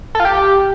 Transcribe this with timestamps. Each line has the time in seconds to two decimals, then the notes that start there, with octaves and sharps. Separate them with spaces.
0.15 A4
0.20 F4
0.25 G4